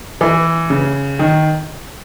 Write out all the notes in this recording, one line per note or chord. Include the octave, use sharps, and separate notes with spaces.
E3
C#3
D#3